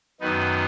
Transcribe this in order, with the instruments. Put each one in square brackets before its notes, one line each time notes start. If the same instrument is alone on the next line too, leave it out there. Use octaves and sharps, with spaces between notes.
[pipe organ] F#2 D#3 B3 D#4